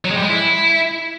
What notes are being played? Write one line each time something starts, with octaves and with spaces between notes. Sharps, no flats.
F#3
G#3
G3
G#3
E4